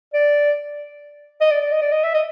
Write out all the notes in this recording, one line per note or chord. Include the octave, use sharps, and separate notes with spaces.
D5
D#5
D5
D5
D#5
D5
D#5
E5
D#5